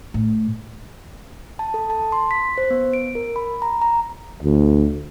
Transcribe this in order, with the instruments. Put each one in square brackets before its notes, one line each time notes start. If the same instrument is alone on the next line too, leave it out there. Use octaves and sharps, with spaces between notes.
[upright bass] A2
[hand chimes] A5
A4
A5
C6
B6
C5
B3
D7
A#4
B5
A#5
A#5
[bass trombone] D2